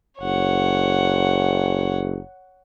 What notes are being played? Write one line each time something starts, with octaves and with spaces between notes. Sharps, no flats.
F#1 C#5 F#5